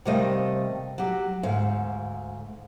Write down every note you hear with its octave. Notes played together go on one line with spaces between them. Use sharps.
C3 D#3 G3 A3 D#5 F5
F#3 G4
D2 G#2 F5